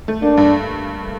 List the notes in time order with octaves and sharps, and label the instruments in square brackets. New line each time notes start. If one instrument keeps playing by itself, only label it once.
[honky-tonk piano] A3
[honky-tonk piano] A#3 [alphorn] D4
[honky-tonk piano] G2